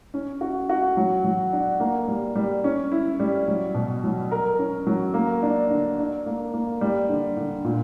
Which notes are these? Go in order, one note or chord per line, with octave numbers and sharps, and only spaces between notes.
C#4
F#4
F#4
F#3
F#3
D4
A#3
G3
G3
C#4
E4
G3
F#3
B2
F#3
A#4
C#4
F#3
A#3
D4
D3
D4
A#3
A#3
G3
D3
D3
A#2